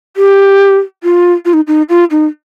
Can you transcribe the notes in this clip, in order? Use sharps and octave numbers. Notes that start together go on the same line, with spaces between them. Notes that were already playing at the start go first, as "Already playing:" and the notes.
G4
F4
F4
D#4
D#4
F4
D#4